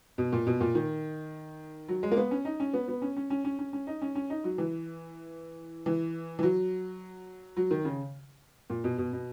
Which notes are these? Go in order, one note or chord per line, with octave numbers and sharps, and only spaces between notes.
B2
A#2
B2
A#2
D#3
F#3
G#3
A#3
B3
C#4
D#4
C#4
B3
B3
C#4
C#4
C#4
C#4
C#4
C#4
D#4
C#4
C#4
D#4
F#3
E3
E3
E3
F#3
F#3
D#3
C#3
A#2
B2
B2
B2